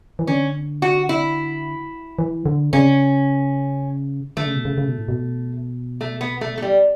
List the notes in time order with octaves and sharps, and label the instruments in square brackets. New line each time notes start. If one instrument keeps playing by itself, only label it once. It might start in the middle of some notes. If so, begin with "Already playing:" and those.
[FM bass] E3
[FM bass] D3 [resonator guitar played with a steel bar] C#4
[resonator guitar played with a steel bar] F#4
E4
[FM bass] E3
D3
[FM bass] C#3 [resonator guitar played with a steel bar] C#4
[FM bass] D3 [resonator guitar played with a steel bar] A3
[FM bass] C#3
B2
C#3
C#3
B2
A2
B2
[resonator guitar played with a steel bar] A3
B3
A3
A3
G3